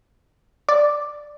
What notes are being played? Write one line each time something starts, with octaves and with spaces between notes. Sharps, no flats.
D5